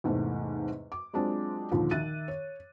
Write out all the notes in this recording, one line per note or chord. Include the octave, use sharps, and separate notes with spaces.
E2 G#2 C3 A3
D6
F#3 G#3 C4 D4 F4 F#4
D#2 A#2 D3 F3
D#3 E5 F#6 A6 D#7
C#5